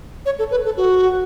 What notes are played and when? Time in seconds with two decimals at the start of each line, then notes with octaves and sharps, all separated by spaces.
0.26 C#5
0.39 A4
0.51 B4
0.65 A4
0.77 F#4